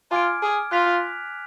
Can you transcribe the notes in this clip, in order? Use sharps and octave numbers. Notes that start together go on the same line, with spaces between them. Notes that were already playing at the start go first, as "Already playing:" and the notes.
F4 G#5 D6 F6 G#6 D7
G#4
F4 F#6 B6 F7